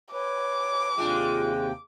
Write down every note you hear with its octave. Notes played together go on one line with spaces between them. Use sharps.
B4 C#5 D6
D#2 C3 G#3 D4 F4 G5